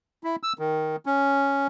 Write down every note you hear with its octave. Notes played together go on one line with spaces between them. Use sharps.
E4
E6
D#3
C#4